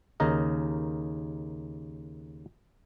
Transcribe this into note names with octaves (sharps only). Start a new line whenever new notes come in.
D#2 C#3 D#4 A#4 D#5